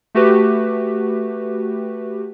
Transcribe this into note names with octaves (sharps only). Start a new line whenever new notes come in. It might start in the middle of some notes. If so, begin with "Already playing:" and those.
A3 F#4 G4 B4